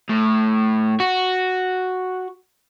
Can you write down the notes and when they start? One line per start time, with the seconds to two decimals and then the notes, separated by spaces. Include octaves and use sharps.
0.10 A2
1.00 F#4